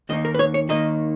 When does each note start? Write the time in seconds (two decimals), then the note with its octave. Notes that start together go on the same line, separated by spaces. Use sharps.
0.09 D#2 D#3 A#3 D#4 D#5
0.25 A#4
0.35 B4
0.39 C#5
0.54 C#5
0.69 D#2 D#3 A#3 D#4 D#5